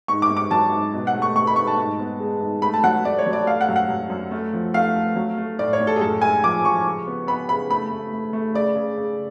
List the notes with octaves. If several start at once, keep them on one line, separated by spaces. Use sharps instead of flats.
G#2 C#6
D6
G#2
D6
F#3 A5
G#2
B2
F#5
A3
C#6
A3 C#6
B5
A3 C#6
A5
G#2
B3
G#3
G#2
A3 B5
A5
F#3 F#5
A3 D5
C#5
F#3
D5
A3 F5
F#5
F#2
F#5
F#2
F#2
A3
F3
A3 F5
A3
F#3
A3
A2 D5
C#5
A2
A4
G#4
F#2 A4
G#3 G#5
F3 D6
F3 C#6
C#3
B3
B3 B5
C#3 B5
A3 B5
A3
A3
A3
C#3 D5
C#3
C#3